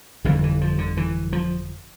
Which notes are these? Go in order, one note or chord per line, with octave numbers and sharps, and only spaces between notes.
G1 F2 D3 E3
E3
F3
D3
E3
F3